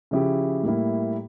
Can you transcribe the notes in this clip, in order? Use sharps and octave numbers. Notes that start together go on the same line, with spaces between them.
C#3 F3 C#4 E4 G4
A2 G3 A#3 E4